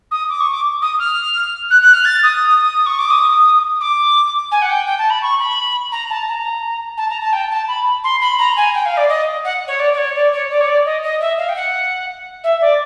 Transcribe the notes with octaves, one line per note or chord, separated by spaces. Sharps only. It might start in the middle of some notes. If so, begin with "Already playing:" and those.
D#6
D6
C#6
D6
D#6
F6
F#6
F#6
F6
A6
D#6
C#6
D6
D#6
D6
G#5
F#5
G5
G5
A5
B5
C#6
B5
A#5
A5
A#5
A5
A#5
A5
G5
A5
B5
C6
B5
A#5
G#5
G5
F5
D5
D#5
F#5
C#5
D5
D5
C#5
D5
C#5
D5
C#5
D5
D#5
D#5
E5
F5
G5
F#5
E5
D5